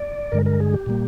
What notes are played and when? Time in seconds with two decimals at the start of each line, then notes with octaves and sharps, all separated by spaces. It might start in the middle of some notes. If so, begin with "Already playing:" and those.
Already playing: D5
0.32 G2 D3 G#3 A#4
0.46 A#4
0.60 G#4
0.74 G4
0.86 A#2 G3 A#3